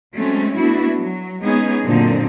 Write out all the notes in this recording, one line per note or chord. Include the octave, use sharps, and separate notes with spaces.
F#3 G#3 A3 C4 C#4
A3 B3 D4 E4 F#4
F#3
G#3 B3 C#4 D#4 G#4
F#2 A#2 D3 C4 D#4